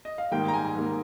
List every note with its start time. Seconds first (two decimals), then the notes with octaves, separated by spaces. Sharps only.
0.05 D#5
0.18 F5
0.31 G#2 D#3 G3 A#3 G5
0.48 A#5
0.54 G#5
0.75 G#2 D#3 G3 A#3